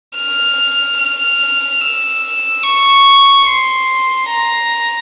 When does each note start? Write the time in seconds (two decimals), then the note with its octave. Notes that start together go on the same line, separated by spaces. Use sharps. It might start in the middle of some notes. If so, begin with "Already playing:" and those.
0.15 F6
0.97 F6
1.80 E6
2.63 C#6
3.46 C6
4.29 A#5